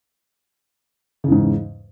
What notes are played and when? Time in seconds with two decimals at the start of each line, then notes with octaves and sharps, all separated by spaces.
1.24 C#3
1.28 E2
1.31 G#2